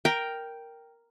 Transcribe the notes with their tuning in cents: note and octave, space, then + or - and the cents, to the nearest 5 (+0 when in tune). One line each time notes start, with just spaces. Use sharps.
A#4 +0 G5 +0